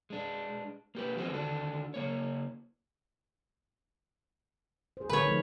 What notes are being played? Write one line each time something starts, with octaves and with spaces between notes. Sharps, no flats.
G#3 D4
A#3 G4 B4
F3 G#3 B3 C4 D4 F#4
D3 D#3 D4 F#4
C#3 A#3 C#5
G#4 C5
D3 A#4 B4 C#5
F3 A3 D#4